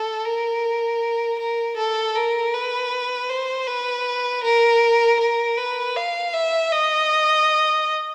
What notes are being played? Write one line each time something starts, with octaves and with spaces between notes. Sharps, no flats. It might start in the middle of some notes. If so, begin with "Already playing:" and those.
Already playing: A4
A#4
A#4
A4
A#4
B4
C5
B4
A#4
A#4
B4
F5
E5
D#5